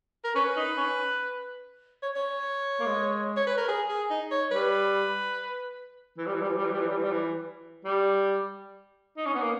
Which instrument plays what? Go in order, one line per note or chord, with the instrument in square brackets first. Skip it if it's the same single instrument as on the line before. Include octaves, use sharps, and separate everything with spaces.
[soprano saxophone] A#4
[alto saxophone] C#4 [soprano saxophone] B4
[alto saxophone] D#4
C#4
[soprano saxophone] C#5
C#5
[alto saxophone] A#3
G#3
[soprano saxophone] C#5
B4
A#4
G#4
G#4
D#4
C#5
[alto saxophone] G3 [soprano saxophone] B4
[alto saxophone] E3
G3
E3
G3
E3
G3
E3
G3
E3
G3
E3
G3
E3
G3
D#4
C#4
B3
A#3